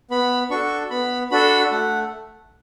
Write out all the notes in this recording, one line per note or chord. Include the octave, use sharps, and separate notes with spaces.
B3 B5
D4 F#4 A4 C#6
B3 B5
D4 F#4 A4 B5
A3 F#5